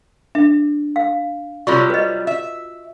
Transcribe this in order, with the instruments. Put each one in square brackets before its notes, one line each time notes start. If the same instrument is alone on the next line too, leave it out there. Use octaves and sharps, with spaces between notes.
[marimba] D4 [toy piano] E5
[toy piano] F5
[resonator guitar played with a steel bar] C3 F#3 G3 [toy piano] F4 F#4 C#6
[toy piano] B4 D#5
[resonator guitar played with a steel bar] E5